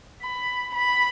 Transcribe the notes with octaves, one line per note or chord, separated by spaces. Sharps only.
B5
B5